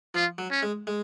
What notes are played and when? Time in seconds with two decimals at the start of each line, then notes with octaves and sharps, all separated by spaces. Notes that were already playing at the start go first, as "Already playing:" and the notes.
0.15 F3 F4
0.38 F#3
0.51 C#4
0.63 G#3
0.87 G#3